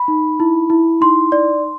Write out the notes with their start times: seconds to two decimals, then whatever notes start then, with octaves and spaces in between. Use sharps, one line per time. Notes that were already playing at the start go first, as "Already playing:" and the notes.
Already playing: B5
0.08 D#4
0.40 E4
0.70 E4
1.01 D#4 C6
1.32 D5